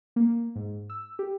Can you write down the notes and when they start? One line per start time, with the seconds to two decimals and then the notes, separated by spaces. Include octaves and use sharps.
0.16 A#3
0.56 G#2
0.90 E6
1.19 G4